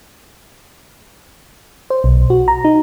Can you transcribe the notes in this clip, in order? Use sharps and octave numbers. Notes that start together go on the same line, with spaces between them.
C5
B1
F#4
A#5
D#4